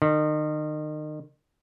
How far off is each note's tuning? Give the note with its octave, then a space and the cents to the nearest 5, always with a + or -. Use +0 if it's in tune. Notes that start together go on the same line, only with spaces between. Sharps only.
D#3 -35